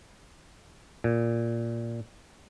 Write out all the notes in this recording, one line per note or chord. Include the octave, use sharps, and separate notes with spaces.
A#2